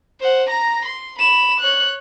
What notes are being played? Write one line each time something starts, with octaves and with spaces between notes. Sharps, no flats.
C5 F#5
A#5 A#6
C6
B5 E7
C#5 F#6